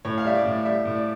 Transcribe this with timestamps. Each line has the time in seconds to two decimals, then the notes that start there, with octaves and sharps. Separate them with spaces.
0.05 A2 C#5
0.18 F5
0.25 G3 E5
0.35 D5
0.46 A2
0.65 G3 E5
0.85 A2
0.95 D5